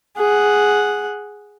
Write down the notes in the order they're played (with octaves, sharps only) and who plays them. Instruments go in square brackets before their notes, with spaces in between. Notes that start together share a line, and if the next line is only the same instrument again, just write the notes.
[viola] G#4 F#5